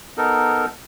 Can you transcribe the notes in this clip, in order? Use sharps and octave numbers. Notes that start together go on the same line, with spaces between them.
B3 D#4 A4 A#4